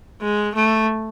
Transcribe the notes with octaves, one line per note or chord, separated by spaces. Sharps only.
G#3
A3